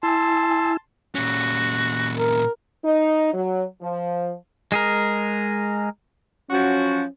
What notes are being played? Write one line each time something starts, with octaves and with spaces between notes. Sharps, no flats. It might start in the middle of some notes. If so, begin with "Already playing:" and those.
E4 G#5 A5 C6 E6
A#2 C#4 F#4
A#4
D#4
F#3
F3
G#3 G#4 A#4
F3 F#3 C#4 F#4